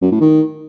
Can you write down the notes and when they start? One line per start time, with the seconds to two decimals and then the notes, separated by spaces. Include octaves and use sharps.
0.02 F#2
0.11 A2
0.21 D#3